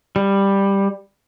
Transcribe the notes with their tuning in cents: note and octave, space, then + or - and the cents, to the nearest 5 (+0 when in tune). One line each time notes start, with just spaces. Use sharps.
G3 +10